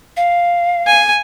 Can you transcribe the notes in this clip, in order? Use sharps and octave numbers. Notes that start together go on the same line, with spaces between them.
F5
G#5